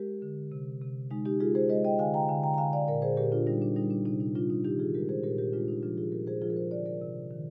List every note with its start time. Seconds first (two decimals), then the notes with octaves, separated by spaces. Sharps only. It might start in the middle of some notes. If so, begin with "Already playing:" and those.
Already playing: G#3 G4 A#4
0.22 D3
0.52 C3
0.82 C3
1.11 G#3 D#4
1.25 D#4 G4
1.40 G#3 F4 G#4
1.55 G#4 C5
1.69 G#3 C5 D#5
1.85 D#5 G5
1.99 D3 F5 G#5
2.14 G5 A#5
2.29 D3 F5 G#5
2.43 G5 A#5
2.54 A#5
2.58 D3 F5 G#5
2.73 D5 F5
2.88 A#2 A#4 D5
3.02 G#4 C5
3.17 A#2 G4 A#4
3.32 D4 F4
3.47 G3 D#4
3.62 D4
3.76 G3 D#4
3.90 D4
4.06 C3 D#4
4.20 D#4
4.35 G3 D4 F4
4.50 D#4
4.64 D#3 D#4 G4
4.79 F4 G#4
4.94 G#3 G4 A#4
5.09 G#4 C5
5.23 A#2 G4 A#4
5.38 G4 A#4
5.53 G#3 D4 F4
5.68 D#4
5.83 F3 D4 F4
5.97 F4 G#4
6.12 A#2 G4 A#4
6.27 G#4 C5
6.42 F3 F4 G#4
6.50 A#4
6.57 G#4 C5
6.71 D3 A#4 D5
6.86 A#4 D5
7.01 C3
7.30 D#3